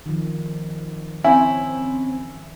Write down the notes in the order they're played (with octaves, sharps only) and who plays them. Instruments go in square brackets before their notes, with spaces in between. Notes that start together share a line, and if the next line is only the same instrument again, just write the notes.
[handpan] D#3 F3
[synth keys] C4 C#4 [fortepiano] E4 [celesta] G#5